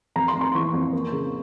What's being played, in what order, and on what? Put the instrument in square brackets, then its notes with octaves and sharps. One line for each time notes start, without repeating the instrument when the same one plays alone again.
[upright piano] F2 A#5
C6
F2
C6
E3 C#6
F2
A#3
C#3